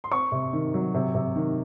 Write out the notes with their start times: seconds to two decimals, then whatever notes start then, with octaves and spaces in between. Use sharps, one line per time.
0.04 C6
0.11 C4 C#6
0.32 C3
0.53 D#3
0.74 F#3
0.94 C3
1.15 C3
1.36 D#3